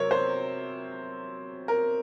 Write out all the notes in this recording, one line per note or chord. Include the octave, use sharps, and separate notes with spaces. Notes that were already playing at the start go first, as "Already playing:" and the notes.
Already playing: C3 F#3 C4 A#4 C#5
C5
A#4